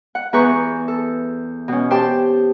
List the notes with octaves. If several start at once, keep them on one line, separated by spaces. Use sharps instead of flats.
F#5
E2 G#4 B4 A#5 C#6 G6
A4
B2 C#4
G4 C5 G5 A5